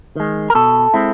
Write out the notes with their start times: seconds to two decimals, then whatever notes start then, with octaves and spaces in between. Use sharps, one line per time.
0.16 D#3 G#3
0.50 A#4
0.55 B2 A4
0.94 G#3 C4 E4